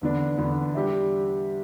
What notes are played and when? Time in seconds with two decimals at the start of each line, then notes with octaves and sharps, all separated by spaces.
0.01 E2 D3 B3 D4
0.38 E2 D3 B3 D4
0.74 G3 D4 G4 E5